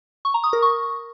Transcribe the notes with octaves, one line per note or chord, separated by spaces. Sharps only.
C#6
A#5
D#6
A#4
C#6